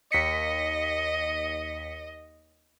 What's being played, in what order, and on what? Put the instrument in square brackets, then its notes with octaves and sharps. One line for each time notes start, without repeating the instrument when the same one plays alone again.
[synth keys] D#2 B6 C#7 [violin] D#5